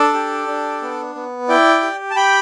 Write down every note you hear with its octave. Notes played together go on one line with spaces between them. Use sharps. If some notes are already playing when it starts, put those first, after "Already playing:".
Already playing: D4 A4 D5
G4
D4
B3
B3
E4 D5 G5
G4
A5
G4 G5 B5